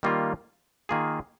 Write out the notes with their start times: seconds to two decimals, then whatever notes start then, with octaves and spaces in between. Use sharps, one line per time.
0.03 D#3 G3 A#3 F4
0.89 D#3 A#3 F4 G#4